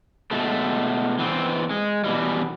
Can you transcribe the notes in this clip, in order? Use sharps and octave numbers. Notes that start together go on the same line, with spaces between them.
B2 G#3 A3
E3 B3 C4
G#3
B2 E3 G3